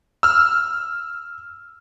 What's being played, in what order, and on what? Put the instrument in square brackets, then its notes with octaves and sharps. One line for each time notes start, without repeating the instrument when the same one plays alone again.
[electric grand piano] E6 F6